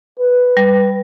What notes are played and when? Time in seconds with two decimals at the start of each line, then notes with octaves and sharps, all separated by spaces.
0.19 B4
0.57 G3